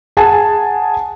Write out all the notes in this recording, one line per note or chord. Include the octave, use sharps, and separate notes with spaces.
G#4 F#5 G#5 A5